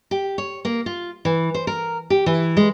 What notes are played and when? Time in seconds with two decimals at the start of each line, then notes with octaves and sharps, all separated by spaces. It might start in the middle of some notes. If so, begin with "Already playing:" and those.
0.11 G4
0.38 C#5
0.65 A#3
0.86 F4
1.25 E3
1.54 C5
1.67 A#4
2.10 G4
2.26 E3
2.57 G#3